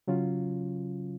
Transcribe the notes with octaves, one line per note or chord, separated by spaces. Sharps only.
C#3 F#3 C#4 F4